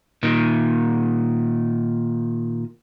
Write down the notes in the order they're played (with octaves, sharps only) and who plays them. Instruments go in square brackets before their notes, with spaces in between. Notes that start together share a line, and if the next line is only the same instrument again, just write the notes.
[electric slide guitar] A#2 D#3